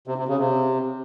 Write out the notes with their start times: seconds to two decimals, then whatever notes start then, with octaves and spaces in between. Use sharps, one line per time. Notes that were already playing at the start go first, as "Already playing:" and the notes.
0.07 C3
0.18 C3
0.28 C#3
0.39 C3